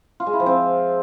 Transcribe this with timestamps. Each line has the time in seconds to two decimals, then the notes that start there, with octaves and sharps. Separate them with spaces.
0.20 F4
0.26 G#3
0.33 E4
0.40 F3
0.46 C4